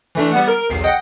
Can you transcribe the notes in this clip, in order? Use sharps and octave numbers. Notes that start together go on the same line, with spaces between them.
E3 A3 D4
G3 B3 F#5
A#4
B1 E2 C7
D#5 F#5 G5